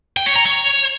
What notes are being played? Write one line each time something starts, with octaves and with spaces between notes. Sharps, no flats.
G5
C#5
A#5
C#5